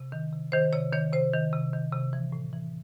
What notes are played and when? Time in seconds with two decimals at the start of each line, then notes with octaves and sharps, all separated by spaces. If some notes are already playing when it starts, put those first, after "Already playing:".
Already playing: C3
0.12 D#3
0.33 C3
0.52 D#3 C5
0.73 C3 C#5
0.93 D#3 C#5
1.13 C3 C5
1.33 D#3
1.53 C3
1.73 D#3
1.92 C3
2.13 E3
2.32 A2
2.53 E3